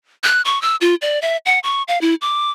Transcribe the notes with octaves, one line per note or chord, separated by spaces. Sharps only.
F#6
C#6
E6
F4
D5
E5
F#5
C#6
F5
E4
D6